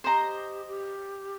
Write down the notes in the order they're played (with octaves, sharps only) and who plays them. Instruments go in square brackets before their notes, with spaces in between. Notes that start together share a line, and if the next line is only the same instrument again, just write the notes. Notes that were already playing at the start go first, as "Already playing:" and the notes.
[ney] G4 [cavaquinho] C5 D#5 A#5
[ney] G4